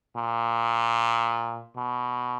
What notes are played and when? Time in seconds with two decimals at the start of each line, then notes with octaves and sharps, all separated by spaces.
0.16 A#2
1.76 B2